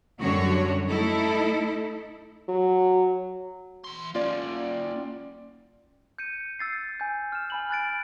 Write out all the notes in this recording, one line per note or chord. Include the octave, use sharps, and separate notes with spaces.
F#2 D3 G3 F#4 C#5
A3 D#4 E4 A4
F#3
E3 C6
A#3 C#4 F4 D5
G6 C#7 D#7
E6 A6 C7
G#5 G6
F6 E7
G#5 B5 F#7
G#5 F#6 A6 D7